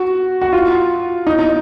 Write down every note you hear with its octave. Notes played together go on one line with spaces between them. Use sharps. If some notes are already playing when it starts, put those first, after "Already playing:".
Already playing: F#4
F#4
F4
D#4
D#4